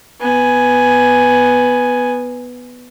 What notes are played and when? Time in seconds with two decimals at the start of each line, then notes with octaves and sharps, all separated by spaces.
0.20 B3 G#5